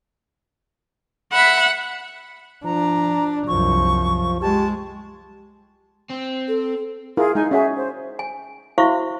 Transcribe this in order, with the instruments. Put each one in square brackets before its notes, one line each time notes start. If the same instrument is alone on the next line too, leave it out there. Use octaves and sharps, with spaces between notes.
[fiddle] E5 B5 [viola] F#5
[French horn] F3 [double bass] D4 [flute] A#5
[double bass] C2 F#2 [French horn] F3 [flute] C#6
[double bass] G#3 [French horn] G4 [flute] A5
[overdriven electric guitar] C4
[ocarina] A4
[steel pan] E4 F4 A#4 [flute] G#4
[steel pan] G#3 G#5 [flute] D#4
[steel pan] C#4 F#4 G#4 [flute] E5
[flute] C5
[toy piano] G#5
E4 F#4 C5 E5 F5 C#6